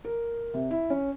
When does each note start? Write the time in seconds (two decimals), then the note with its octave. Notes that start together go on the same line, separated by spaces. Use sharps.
0.05 A#4
0.54 C3
0.71 E4
0.90 C#4